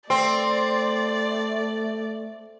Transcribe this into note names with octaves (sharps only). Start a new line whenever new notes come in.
A3 C4 D5 C6